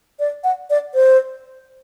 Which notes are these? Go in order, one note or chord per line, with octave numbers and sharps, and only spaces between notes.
D5
F#5
D5
C5